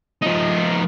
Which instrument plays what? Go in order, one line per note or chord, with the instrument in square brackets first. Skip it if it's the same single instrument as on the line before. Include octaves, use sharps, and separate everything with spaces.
[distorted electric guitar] F3 D#4